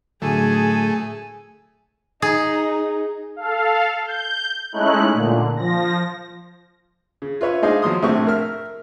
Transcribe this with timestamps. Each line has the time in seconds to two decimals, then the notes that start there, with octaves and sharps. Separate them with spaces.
0.22 A2 D3 F#3 A3 G#4 G#5
2.22 D#4 G#4
3.36 A4 F5
4.05 G6
4.72 G#3 A3 C#4 D#4 E4 F#6
5.13 A#2 D3
5.56 F3 A#6
7.22 C#3
7.41 F4 B4 C#5 E5
7.62 G#3 D4 D#4 G#4 C5 F5
7.82 F3 F#3 C6 D#6
8.03 A#1 A2 C3 C4 C#6
8.27 A#4 E5 F6